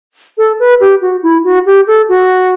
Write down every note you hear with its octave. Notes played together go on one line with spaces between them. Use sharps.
A4
B4
G4
F#4
E4
F#4
G4
A4
F#4